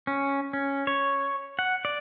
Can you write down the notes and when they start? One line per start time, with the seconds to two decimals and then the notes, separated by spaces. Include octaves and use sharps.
0.07 C#4
0.53 C#4
0.87 C#5
1.59 F#5
1.85 D5